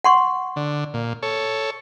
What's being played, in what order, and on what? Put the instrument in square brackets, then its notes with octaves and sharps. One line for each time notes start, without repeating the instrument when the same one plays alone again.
[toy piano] F#5 C6 C#6
[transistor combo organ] D3
A#2
A4 C#5